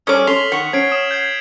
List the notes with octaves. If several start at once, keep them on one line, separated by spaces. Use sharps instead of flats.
G3 C#4 A4 C#5 D6 D#6 F6
C#4 A4 C6 B6 F7 G7
D#3 F#5 C#6
C#4 G#6 C7 D7
D#6 E7
G6 G#6 C7